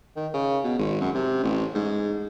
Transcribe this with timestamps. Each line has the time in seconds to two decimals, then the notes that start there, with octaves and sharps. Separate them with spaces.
0.16 D#3
0.34 C#3
0.64 B2
0.79 G#1
1.01 F#2
1.15 C3
1.43 A1
1.75 G#2